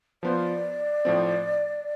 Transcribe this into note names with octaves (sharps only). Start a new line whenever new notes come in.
F3 B3 F4 C5 D5
A2 F3 C4